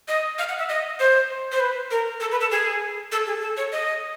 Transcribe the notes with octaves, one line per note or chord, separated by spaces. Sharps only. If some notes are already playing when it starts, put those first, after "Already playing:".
D#5
F5
F#5
E5
D#5
C5
C5
B4
A#4
A4
B4
A4
G#4
A4
G#4
A4
C#5
D#5